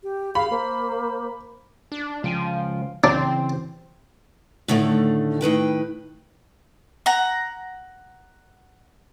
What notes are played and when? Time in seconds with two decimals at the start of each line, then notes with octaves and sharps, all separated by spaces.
0.03 G4
0.35 G#4 F5 B5
0.51 A#3 C5
1.92 D4
2.24 C#2 F3 G5 G#5
3.04 C#3 E3 C4 D4
4.68 A2 D3 D#3 G#3 A3
5.41 A2 D#3 B4 G5
7.06 F#5 A#5